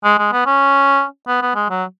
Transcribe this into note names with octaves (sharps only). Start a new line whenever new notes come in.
G#3
G#3
B3
C#4
B3
B3
G#3
F#3